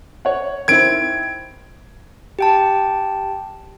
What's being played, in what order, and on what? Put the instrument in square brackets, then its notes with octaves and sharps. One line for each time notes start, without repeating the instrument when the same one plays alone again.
[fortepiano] C#5 F#5
[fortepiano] D#3 C4 E4 [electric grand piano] G#6 D7
[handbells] G4 G5 A5